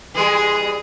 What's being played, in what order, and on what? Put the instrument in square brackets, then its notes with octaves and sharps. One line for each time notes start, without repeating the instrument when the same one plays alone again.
[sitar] E3 G3 G#3 [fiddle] G#4